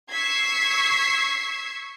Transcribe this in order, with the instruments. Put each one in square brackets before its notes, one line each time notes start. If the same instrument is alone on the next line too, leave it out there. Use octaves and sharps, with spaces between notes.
[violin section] C#6 E6 G#6 B6 C7